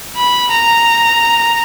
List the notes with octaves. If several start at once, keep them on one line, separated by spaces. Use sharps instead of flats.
B5
A#5